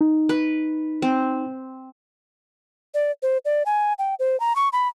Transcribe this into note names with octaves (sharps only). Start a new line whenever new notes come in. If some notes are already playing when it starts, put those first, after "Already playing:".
D#4
B4
C4
D5
C5
D5
G#5
G5
C5
A#5
C#6
B5